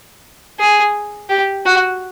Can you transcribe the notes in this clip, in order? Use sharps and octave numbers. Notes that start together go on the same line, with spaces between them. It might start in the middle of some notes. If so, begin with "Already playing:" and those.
G#4
G4
F#4